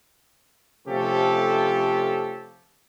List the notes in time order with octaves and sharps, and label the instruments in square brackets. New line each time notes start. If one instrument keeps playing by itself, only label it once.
[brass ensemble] C3 F3 A3 C#4 G4 A4